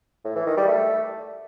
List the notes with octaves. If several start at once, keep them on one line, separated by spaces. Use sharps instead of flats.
A2
E3
D#3
G3
A3